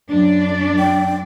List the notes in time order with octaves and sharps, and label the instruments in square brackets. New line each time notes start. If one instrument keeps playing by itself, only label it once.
[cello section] F#2 D4 D5
[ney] G5